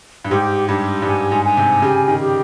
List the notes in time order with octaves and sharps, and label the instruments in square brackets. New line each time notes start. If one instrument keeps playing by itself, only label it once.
[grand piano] G2
[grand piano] G#2 [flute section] G4
[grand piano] G2 [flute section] G4
[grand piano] G2
[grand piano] G#2 [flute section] G#5
[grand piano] G#2
[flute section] G#5
[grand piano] C3
[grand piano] C#3 [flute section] G4
[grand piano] D#3
[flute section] G4